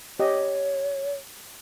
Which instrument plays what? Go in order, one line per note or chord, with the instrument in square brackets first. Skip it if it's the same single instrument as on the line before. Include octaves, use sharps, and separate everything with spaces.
[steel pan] G4 D#5 [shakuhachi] C#5